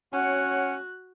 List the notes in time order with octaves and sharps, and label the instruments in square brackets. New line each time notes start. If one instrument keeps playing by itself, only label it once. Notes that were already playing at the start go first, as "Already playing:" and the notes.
[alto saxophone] C#4 [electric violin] F#4 F#6 [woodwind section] C#5 F#5